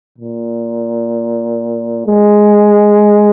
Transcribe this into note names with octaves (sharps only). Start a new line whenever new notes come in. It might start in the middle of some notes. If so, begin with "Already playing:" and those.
A#2
G#3